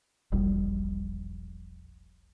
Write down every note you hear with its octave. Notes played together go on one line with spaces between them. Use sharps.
E1 A#1 G3